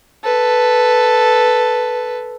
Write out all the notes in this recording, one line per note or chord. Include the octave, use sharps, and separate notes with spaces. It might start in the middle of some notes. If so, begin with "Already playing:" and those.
A4 B4